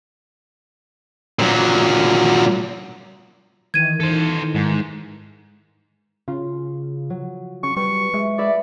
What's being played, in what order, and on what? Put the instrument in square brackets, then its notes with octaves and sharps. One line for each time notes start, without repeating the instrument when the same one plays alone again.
[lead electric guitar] A#2 F#3
[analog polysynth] D#3 E3 [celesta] G#6 D#7
[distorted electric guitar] A4 C5
G#2
[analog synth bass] C#3 [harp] F4
[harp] F#3
[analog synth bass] C#3 [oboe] C#6
[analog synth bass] G3 [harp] B4 [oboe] C#6
[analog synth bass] G#3 [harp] E5
[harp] G#4 B4 E5 [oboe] D5